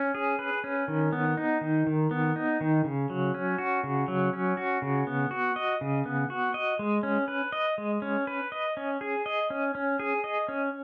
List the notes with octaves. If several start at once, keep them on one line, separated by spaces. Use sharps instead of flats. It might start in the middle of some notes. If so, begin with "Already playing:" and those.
Already playing: C#4
G#4
B4
C#4
D#3
B3
D#4
D#3
D#3
B3
D#4
D#3
C#3
F#3
C#4
F#4
C#3
F#3
C#4
F#4
C#3
B3
F#4
D#5
C#3
B3
F#4
D#5
G#3
C#4
B4
D#5
G#3
C#4
B4
D#5
C#4
G#4
D#5
C#4
C#4
G#4
D#5
C#4